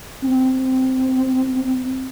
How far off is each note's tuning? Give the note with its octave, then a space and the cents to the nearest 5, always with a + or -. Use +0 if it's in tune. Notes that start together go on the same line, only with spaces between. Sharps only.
C4 -10